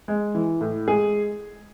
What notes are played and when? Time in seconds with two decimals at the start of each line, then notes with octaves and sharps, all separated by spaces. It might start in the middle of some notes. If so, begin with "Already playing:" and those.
0.08 G#3
0.34 E3
0.61 A2
0.88 G#3 G#4